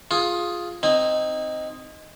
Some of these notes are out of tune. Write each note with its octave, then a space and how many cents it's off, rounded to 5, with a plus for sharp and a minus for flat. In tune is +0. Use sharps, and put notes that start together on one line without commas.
F4 +0 G#4 +0 C6 +25
C4 +0 D#4 +0 G#5 -35